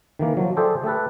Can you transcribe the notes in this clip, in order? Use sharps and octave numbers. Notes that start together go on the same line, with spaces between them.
D#3 E3 A#3
F3 F#3
G#4 A4 C5 D5 E5 G5
A3 G4 A4 B4